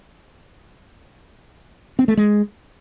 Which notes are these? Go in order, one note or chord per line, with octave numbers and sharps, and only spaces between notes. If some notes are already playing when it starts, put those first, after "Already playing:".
C4
A3
G#3